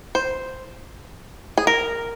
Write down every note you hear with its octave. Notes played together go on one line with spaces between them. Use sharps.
C5
G#4
A#4